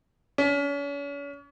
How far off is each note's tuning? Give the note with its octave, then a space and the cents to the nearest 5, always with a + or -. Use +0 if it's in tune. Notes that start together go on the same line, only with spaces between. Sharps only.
C#4 +40